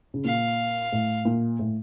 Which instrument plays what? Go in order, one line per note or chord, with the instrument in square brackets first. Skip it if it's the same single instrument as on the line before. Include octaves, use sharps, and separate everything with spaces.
[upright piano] C#3
[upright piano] A#2 [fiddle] F5
[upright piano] A2
A#2
A2